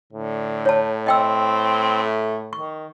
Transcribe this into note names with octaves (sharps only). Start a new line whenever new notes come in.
A2 D3
C#5 A5
C4 D#5 G5 E6
A3
D#3 C#6